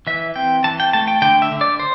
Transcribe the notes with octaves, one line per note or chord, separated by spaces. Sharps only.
E3 E5
C4 G5
E3 A5
G5
A3 A5
G5
D3 G5
E5
D3
D5
C5